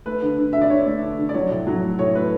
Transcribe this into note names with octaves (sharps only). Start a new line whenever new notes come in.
A3 B4
D3
D3
D3 E5
D5
D3 C#5
A3
D3
D3
D5
F#3 C#5
A2
F#3
A3
A2 C#5
A3 B4